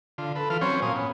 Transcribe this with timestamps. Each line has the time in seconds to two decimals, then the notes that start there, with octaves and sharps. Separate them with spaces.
0.18 D3 F4
0.35 A4 B4
0.50 E3 F4 A4 F6
0.61 F#3 C4 C#4 C5 C#5
0.82 A#2 F5 G#5 D#6
0.96 B3